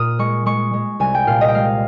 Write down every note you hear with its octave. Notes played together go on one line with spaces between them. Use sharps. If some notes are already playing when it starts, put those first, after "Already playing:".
Already playing: A#2 D#6 F6
G#3 C#6
G#3 C#6
G#3
C2 G#5
G5
A#2 F5
D#5
G5
G#3 F5